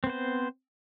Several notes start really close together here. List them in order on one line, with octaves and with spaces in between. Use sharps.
C4 B3 C5